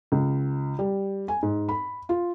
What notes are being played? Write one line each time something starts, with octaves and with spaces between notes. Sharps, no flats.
C#2
G3
G#5
G#2
B5
F4